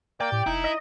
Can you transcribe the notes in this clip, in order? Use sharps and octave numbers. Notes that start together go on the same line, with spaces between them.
A#3 D5 G5
A2 G4
F1 D#4 E4
D#5